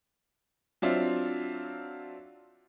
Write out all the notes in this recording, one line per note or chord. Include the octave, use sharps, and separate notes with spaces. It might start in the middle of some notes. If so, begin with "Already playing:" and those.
F#3 C4 D4 F4 E5